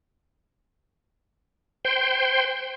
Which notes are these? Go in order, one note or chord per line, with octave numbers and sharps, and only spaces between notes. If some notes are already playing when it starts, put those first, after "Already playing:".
C5 G5 C6